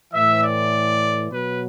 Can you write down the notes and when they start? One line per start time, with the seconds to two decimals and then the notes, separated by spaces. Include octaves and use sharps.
0.14 A2 E3 E5
0.43 D5
1.30 B2 F#3 B4